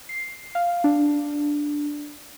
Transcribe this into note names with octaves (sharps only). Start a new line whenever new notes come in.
C7
F5
D4